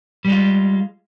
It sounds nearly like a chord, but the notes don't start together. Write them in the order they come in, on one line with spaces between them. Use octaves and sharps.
G3 G#3 F4